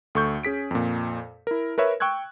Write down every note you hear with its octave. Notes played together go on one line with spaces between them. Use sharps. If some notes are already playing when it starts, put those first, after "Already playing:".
D2 A4 C#6 G6
C#4 G#4 B6 D7
F2 A#2
E4 A#4
A#4 B4 C#5 E5
G5 C#6 E6 F#6 G#6